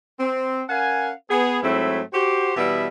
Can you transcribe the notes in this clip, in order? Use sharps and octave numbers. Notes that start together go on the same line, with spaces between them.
C4
C#4 A#4 F5 F#5 G#5
B3 G#4
G#2 F#3 A3 C4 E4
F#4 G4 C5
B2 E3 G3 B3 E4 E5